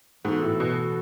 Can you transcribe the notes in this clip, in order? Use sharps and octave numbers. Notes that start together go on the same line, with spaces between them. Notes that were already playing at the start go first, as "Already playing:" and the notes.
G#2 E3 B3 F#4 A4
A2
B2